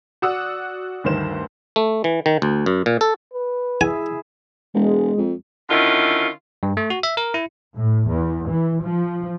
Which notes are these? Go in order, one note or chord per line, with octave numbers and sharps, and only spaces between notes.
F#4 D5 F#5 D#6 E6
D2 G2 D#3 C5 E7
A3
E3
D#3
D2
F#2
A#2
A4
B4
E4 G#4 E5 G#5
E1 G#3
F2
D3 D#3 C#4 E4 F4
G2
A3
F#4
E5
A#4
E4
A2
E2
E3
F3